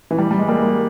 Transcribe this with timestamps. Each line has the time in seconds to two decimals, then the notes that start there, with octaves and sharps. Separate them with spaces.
0.11 E3
0.18 G3
0.31 G3
0.39 G#3
0.48 G3 A#3